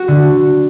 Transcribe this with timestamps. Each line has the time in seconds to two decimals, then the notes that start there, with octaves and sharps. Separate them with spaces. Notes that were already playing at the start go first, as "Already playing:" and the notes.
Already playing: F#4
0.08 D3